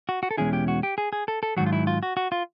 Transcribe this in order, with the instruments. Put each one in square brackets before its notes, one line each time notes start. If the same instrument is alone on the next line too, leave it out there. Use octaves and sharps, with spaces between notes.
[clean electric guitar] F#4
F#4
A4
E2 B2 G#3 C#4 E4 G#4
G4
F#4
G4
G#4
G#4
A4
A4
G#2 D#3 F#3 F#4
F4
E4
F4
F#4
F#4
F4